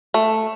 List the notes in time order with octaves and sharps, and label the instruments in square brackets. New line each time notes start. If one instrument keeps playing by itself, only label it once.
[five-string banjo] A3